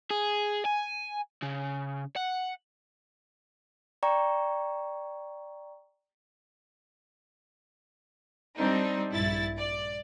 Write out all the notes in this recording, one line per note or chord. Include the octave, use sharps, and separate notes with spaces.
G#4
G#5
C#3
F#5
D5 G5 A#5 C#6
G3 C4 D4 D#4
A#1 G2 E4 A6
D5